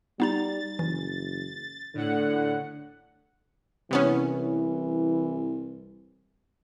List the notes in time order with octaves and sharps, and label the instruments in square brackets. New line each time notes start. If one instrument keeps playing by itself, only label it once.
[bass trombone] G3 [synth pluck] B3 D#4 A#5 [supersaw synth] A6
[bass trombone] F#1 [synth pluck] E3
[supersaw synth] A2 F#5 [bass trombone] D3
[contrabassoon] C2 [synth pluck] C3 B3 C#4 [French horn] E3